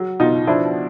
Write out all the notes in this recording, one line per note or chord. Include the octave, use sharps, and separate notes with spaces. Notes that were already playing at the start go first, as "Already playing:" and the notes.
Already playing: F#3
B2 D#4 F4
F3 D4 E4